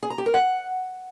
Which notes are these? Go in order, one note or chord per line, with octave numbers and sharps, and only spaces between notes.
G#4
A#5
G4
A#4
F#5